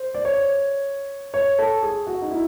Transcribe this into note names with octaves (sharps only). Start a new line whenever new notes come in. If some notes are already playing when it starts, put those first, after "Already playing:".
Already playing: C5
D5
C#5
C#5
A4
G#4
F#4
D#4
E4